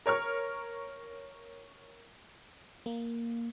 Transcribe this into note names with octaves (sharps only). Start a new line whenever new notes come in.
A#4 C#5 C#6 F6
A#3